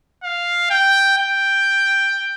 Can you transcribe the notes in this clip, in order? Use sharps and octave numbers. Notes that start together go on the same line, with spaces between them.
F5
G5
G5